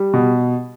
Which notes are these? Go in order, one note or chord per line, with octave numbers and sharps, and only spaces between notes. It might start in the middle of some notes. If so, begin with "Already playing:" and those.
Already playing: G3
B2